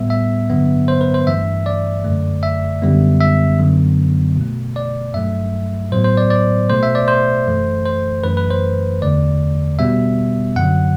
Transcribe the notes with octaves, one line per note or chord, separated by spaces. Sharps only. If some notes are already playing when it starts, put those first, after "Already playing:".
Already playing: A2 G3 B3 E5
E5
G2 D3 F#3 B3
C5
B4
C5
G2 E3 A3 E5
D5
F#2 D3 A3
E5
F#2 D3 G3 B3
E5
F#2 D3 F#3 B3
B2 A3
D5
G2 F#3 A3 E5
A2 F#3 B3 C5
C5
D5
D5
B2 A3 C5
E5
D5
C5
F#2 E3 A3
C5
F#2 E3 A3 B4
B4
C5
E2 D3 A3 D5
B2 G3 B3 E5
F#2 D3 F#3 F#5